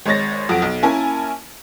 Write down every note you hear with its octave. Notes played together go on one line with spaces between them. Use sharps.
G#1 G#3 C#5 A6 A#6
F2 F#3 F#4 D7
B1
A#3 C#4 E4 A#4 G#5 A5